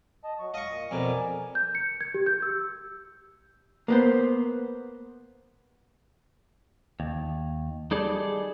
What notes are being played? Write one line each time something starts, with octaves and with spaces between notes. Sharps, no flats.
D#5 A5
F#3 C#6
D#5 F5 C#6
A#2
F2 B2 A#4 D5 G#5
G6
C#7
G#6
G4
G6
E6
A#3 B3 C5
D#2
G3 D#4 G#4 A4 D5